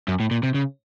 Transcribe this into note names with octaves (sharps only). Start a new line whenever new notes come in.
F#2
A2
A#2
C3
C#3